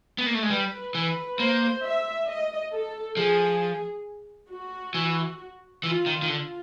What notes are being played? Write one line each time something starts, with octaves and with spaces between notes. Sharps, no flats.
B3
A#3
A3
G#3
G3 B4
E3 B4
A#3 C5
E5
D#5
A4
F3 G#4
F#4
E3
E3 F4
D#3
D#3
D3 F4